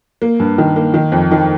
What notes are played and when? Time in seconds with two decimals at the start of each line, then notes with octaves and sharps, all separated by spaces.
0.22 A#3
0.40 G2
0.58 D#3
0.76 A#3
0.94 D#3
1.12 F2
1.31 D#3